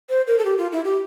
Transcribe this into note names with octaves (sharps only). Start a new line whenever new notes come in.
C5
A#4
A4
G4
F4
E4
G4